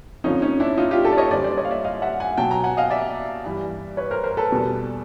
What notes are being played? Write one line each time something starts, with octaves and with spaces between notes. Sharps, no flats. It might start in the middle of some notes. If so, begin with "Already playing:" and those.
F2 D3 F3 C#4 D#4
C#4 D#4
D4 E4
D#4 F4
F4 G4
G4 A4
D5
C#5 D#5
F#2 D3 G3 C5 D5
C5 D5
C#5 D#5
F5
D5 E5
D#5 F5
E5 F#5
F#5 G#5
B2 F#3 G5 A5
G#5 A#5
F#5 G#5
D#5 F5
D5 E5
G2 E3 G3
B4 C#5
A#4 C5
A#4 C5
A4 B4
E2 B2 G3